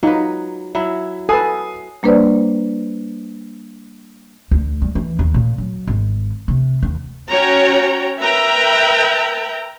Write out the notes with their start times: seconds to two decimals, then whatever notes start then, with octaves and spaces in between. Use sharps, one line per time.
0.03 F#3 D#4 F4 B4
0.75 F#3 E4 E5
1.29 A4 B4 F#5 G#5 D#6 C7
2.03 G3 A#3 D4 B4 C5 D5
4.51 D2
4.82 G3
4.95 E3
5.19 D#2
5.34 A#2
5.58 F#3
5.87 G#1
6.48 C3
6.83 D#2
7.29 C#4 F#4 C#5 G5 A#5
8.19 A#4 B4 E5 G5 A#5